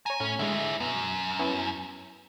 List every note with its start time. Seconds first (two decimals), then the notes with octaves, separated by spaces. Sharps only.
0.06 C#5 G#5 A#5
0.20 A2 C#4
0.39 G#2 D3 G#3 E4
0.80 F#2 B2
1.39 B3 C#4 E4